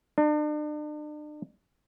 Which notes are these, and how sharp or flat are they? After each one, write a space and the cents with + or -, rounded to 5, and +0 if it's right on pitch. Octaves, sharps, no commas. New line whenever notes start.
D4 +40